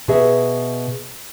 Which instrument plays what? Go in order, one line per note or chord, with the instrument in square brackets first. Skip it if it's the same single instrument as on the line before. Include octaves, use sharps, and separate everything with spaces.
[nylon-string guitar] B2 G#4 E5